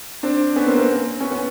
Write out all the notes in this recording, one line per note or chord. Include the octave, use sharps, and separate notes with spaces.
C4 D4
B3 C#4
A#3 C4
A#3 C4
B3 C#4
B3 C#4